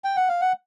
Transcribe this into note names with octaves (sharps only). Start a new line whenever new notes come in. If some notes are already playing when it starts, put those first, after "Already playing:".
G5
F#5
F5
F#5